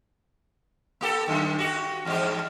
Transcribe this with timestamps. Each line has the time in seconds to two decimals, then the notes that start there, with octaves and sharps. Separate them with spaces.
1.01 A#3 G4 A4
1.28 F#2 D#3
1.59 F#4 G4
2.05 E2 G#2 G4